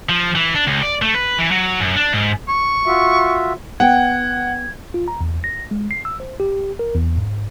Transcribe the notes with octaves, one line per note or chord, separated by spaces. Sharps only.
F3
E3
D4
C#2
D5
A3
B4
E3
F#3
F#2
D4
G#2
C#6
F4 F#4 E5
B3 F#5 G5 G#6
F4
A#5
E2
A#6
G#3
C7
E6
C5
G4
A#4
E2
G#2